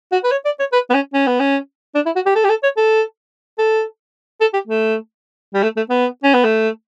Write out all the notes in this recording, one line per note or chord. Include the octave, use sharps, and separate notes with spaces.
F#4
B4
C#5
D5
C#5
B4
B3
C#4
C#4
B3
C#4
D4
E4
F#4
G4
A4
G4
A4
C#5
A4
A4
A4
G4
A3
G3
A3
A3
B3
C#4
B3
A3